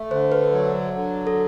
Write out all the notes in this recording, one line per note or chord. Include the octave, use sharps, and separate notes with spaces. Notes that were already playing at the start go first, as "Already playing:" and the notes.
Already playing: A3
D3 C5
B4
F#3
D3
A4